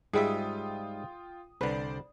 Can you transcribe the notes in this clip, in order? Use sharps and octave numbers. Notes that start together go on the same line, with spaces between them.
G#2 G3 F4 G#4 E5 G5 D#6
C2 D3 B4 C5 D5